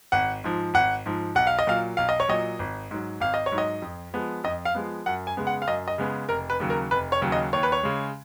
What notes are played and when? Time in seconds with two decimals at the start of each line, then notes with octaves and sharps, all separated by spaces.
0.12 G#1 F#5
0.44 G#2 F3
0.74 G#1 F#5
1.06 G#2 F3
1.35 B1 F#5
1.47 F5
1.59 D#5
1.67 A#2 F#3 F5
1.97 B1 F5
2.09 D#5
2.20 C#5
2.28 A#2 F#3 D#5
2.59 G#1
2.91 G#2 F#3
3.20 G#1 F5
3.34 D#5
3.46 C#5
3.52 G#2 F#3
3.58 D#5
3.82 F2
4.14 F3 G#3 B3
4.44 F2 D#5
4.65 F5
4.75 F3 G#3 B3
5.06 F#2 F#5
5.27 G#5
5.37 C#3 G#3 B3
5.47 F#5
5.62 F5
5.67 F#2 D#5
5.88 D#5
5.98 C#3 G#3 B3
6.29 F1 A#4
6.50 B4
6.60 D#2 C#3 F#3
6.70 A#4
6.91 F1 B4
7.12 C#5
7.21 D#2 C#3 F#3
7.32 D#5
7.53 D#2 C#5
7.63 B4
7.72 C#5
7.83 C#3 G#3